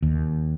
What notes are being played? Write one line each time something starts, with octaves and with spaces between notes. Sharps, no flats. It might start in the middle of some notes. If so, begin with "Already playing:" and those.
D#2